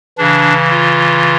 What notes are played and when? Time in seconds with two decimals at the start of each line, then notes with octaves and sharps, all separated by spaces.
0.18 C#3 E3 D4
0.70 F4